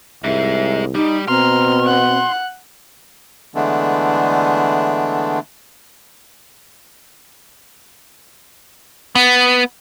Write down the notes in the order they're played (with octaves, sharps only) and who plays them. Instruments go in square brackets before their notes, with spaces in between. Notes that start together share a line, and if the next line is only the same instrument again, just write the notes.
[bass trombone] C2 [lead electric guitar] G#2 G#3 [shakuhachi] E5
[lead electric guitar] G3 G4 [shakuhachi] D#4
[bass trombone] B2 [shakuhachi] C4 [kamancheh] A#5 F6 [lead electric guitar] C6
[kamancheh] F#5 F#6
[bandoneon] D3 E3 G#3 A3 B3 D4
[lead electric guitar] B3